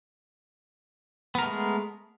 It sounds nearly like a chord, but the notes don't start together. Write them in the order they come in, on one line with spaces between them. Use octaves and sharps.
B3 A#4 A3 G#3